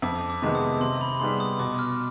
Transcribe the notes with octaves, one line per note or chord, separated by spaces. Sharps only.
F2 D6
D6
C3 D#3 G#3 B3
D#6
C3 C6
B5
G3 B3 D#4 G#4 C6
D#6
B2 D6
F6